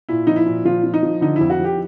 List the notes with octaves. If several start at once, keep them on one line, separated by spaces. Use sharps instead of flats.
A#2 E4
F3 D#4
E4
A#2
F3 F4
F3
D#4
F3
D3 D#4
F2 E4
F#4
F3 G4